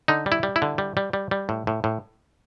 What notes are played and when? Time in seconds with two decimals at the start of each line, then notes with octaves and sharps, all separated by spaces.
0.08 D3 D#4
0.26 G3
0.32 E4
0.43 G3
0.56 E4
0.62 D3
0.78 G3
0.97 G3
1.13 G3
1.31 G3
1.49 A2
1.67 A2
1.84 A2